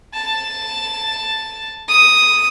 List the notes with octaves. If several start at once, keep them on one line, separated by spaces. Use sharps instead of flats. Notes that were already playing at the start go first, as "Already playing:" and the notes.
A5
D#6